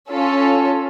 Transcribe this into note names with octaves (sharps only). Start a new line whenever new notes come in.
C#4 F4 A4